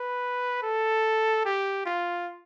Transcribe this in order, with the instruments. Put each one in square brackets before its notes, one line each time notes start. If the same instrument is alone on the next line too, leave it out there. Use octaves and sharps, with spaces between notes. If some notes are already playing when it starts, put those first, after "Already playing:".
Already playing: [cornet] B4
A4
G4
F4